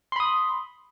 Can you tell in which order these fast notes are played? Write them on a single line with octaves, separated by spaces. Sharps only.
C6 B5 D#6